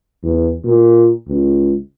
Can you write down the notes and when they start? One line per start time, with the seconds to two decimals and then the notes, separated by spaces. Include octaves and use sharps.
0.23 E2
0.65 A#2
1.28 C#2